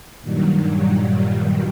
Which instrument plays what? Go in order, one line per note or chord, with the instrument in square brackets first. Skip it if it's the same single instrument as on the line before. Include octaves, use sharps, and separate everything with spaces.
[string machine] G2 A#2 D#3 F#3 G3